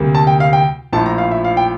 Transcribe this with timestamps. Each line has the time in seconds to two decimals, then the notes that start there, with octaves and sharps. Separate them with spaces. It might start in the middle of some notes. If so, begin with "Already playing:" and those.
Already playing: D2 C3 G3 A#3
0.15 A5
0.27 G5
0.40 F5
0.53 G5
0.93 A#1 A2 F3 A5
1.06 A#5
1.18 F5
1.31 E5
1.45 F5
1.57 G5